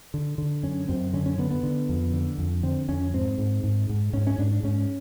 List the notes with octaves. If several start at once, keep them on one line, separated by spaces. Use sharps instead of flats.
D3
D3
F#2 C#4
F#2 C4
D3 C#4
C#4
D3 B3
B3
D3
F2
D3
F2
D3 C4
F2 C#4
G#2 C4
G#2
G#2
G#2
G#2 C#4
C#4
G#2 D4
D4
G#2 C#4